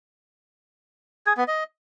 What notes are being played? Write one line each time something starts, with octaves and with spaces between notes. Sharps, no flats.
G#4
B3
D#5